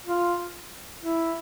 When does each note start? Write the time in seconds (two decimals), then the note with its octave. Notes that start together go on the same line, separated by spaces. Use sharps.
0.06 F4
1.03 E4